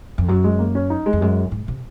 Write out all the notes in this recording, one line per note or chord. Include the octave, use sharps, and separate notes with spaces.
F2
F#2 F#3
G#3
A#3
C#4
D#4
G#3
F2
F#2 G#3
G#2
C3